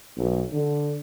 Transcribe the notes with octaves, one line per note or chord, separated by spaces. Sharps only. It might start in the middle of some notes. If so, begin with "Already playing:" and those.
B1
D3